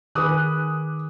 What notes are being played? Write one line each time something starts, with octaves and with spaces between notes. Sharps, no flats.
D#3 G#4 B4 D6 D#6 F#6